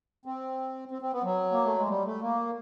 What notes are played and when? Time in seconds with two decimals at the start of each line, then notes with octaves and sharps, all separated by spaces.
0.25 C4
0.91 C4
1.02 C4
1.13 B3
1.23 F#3
1.52 A#3
1.65 A3
1.76 G#3
1.89 G3
2.05 A3
2.22 A#3